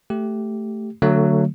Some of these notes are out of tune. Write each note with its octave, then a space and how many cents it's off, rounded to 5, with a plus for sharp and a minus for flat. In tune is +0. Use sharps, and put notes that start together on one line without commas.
A3 +0 G4 -5
D3 +0 F#3 +0 A3 +25